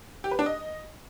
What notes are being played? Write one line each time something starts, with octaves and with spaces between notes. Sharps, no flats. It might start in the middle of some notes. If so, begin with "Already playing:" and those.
G4
B4
D4
D#5